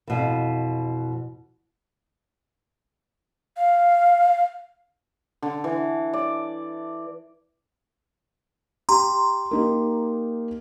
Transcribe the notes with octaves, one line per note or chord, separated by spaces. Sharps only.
F2 B2 E3
F5
D3
E3
D5
G4 A#5 C6
A#3 D#4 G4